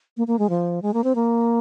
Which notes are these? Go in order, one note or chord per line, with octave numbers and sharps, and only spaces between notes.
A#3
A#3
G#3
F3
G#3
A#3
C4
A#3